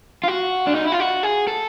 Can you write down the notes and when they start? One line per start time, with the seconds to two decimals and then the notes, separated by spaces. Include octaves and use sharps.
0.24 F4
0.28 F#4
0.67 D4
0.75 D#4
0.84 E4
0.92 F4
1.00 F#4
1.23 G#4
1.47 A4